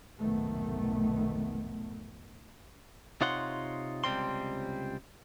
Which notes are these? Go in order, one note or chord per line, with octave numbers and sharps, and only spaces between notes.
F1 B1 G#2 D#3 A3 B3
C3 D#4 F4 C#5 F#5 C6
C#2 C3 G3 C4 C6